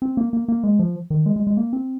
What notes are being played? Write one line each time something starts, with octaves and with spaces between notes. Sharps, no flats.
C4
A#3
A#3
A#3
G#3
F3
D#3
G#3
G#3
G#3
A#3
C4